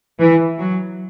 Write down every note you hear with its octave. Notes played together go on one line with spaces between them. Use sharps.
E3
F#3